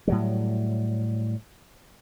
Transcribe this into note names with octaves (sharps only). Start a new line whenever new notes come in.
A2 F#3 G3